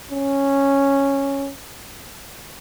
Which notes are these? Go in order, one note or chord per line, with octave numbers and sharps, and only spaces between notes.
C#4